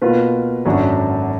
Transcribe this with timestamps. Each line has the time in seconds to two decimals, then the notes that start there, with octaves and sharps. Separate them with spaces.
0.01 B2 A#3 F4 B4
0.65 G#1 F#2 D3 F#3 D4